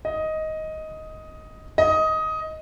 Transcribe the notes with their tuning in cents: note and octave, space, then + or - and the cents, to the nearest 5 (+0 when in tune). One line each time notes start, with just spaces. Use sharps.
D#5 +10
D#5 +15